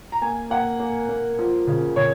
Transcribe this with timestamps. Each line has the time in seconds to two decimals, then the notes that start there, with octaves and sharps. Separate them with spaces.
0.12 A#5
0.21 A#3 G#5
0.50 A#3 F#5
0.79 A#3
1.09 A#3
1.39 F3
1.67 C#3
1.96 C#3 C#5